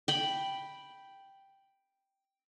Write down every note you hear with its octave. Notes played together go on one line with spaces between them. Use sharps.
G5 B5